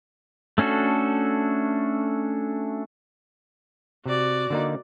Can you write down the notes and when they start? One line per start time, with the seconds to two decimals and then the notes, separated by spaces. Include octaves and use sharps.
0.58 A3 C#4 D4 F#4 A4
4.06 C3 F#4 D5
4.50 D3 A#3 D#4